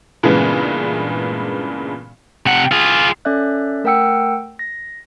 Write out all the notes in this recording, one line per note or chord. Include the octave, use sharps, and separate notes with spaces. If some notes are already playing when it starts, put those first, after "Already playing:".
G2 A#2 C#3 E3 G#3 B3
C3 F#5
F4 G#4
C#4 A4 D5 E5 F#6
A3 A#4 F#5 G5 E6 C#7
A#6